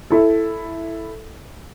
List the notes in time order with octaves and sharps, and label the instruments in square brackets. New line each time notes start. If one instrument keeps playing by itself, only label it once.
[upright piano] E4 A4